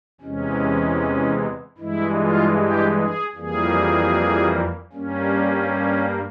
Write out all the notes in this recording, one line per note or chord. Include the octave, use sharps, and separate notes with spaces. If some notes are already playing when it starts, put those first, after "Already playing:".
E2 C3 E3 G#3 C#4
G2 E3 G#3 E4
F4
G4
G#4
F2 E3 G3 A#3 G#4
G2 G3 A#3 C#4